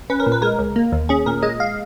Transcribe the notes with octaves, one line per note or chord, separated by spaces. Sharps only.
C#4 B4
A#4
A#2
B4
G#3 A#4
C#2
A#3
D#2
C#4 G#4
A#2 A#4
G#3 D#5
F5